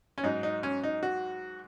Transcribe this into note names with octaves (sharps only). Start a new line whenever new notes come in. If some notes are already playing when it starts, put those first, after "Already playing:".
C#4
G#2 F#3 D#4
D#4
C#4
D#4
F#4